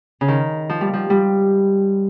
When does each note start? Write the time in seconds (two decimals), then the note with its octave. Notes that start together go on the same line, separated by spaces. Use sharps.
0.21 C#3
0.28 D#3
0.70 F3
0.81 G3
0.94 F3
1.10 G3